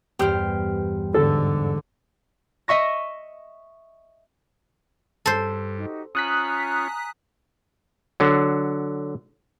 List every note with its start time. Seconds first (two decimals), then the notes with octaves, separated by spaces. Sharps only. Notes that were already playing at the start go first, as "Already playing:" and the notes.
0.19 E2 G2 G4 C5 F6
1.14 G#2 D3 A4
2.68 D#5 E5 C#6 A#6
5.26 G2 A4 C5
5.77 D#4 F#4 G4
6.15 C#4 F4 G#5 A#5 D#6 F#6 B6
8.20 D3 F#3